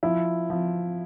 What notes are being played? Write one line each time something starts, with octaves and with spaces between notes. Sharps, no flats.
F3 E4
F3